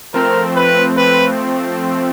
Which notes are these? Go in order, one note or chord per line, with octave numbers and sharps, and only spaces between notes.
F3 A3 C4 A#4
B4
B4